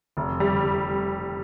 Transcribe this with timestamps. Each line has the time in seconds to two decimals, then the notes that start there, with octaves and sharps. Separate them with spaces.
0.17 F1
0.40 G3